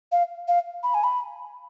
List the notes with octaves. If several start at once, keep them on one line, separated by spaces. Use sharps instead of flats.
F5
F5
B5
G#5
B5